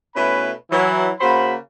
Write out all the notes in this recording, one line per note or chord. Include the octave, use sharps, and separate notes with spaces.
B2 A3 C#4 E4 B4 B5
E3 F#3 E4
C#3 A#3 F#4 C5 B5